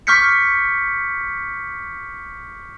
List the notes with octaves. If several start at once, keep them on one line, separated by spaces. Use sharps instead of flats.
C#6 D6 F6 G6 B6 C#7